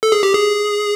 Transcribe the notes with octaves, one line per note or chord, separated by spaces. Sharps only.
A4
G#4
G4
G#4